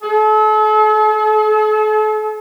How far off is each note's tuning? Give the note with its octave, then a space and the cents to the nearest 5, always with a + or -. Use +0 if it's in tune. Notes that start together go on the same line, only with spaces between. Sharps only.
A4 -40